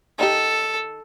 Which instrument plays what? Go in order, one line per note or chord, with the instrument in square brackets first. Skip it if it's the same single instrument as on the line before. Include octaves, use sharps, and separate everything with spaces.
[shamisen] D#3 D#4 G4 [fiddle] A4